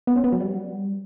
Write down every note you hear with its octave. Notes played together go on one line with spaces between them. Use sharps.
B3
C#4
B3
F#3
G3